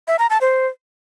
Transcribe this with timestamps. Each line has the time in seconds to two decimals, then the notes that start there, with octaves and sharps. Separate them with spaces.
0.08 E5
0.19 A#5
0.30 A5
0.41 C5